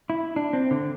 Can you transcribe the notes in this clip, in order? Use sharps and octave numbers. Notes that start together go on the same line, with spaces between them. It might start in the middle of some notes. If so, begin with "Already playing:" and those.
E4
D4
C4
D3